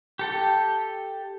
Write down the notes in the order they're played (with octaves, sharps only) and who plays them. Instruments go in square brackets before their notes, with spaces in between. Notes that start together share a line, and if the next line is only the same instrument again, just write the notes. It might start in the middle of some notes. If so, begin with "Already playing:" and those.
[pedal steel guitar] G4 A4 G5